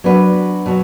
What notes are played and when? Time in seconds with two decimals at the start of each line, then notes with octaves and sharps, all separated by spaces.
0.04 F#3 B3 D4 B4
0.66 B2 F#3